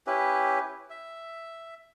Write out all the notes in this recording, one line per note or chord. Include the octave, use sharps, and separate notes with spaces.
C#4 E4 G4 B4
E5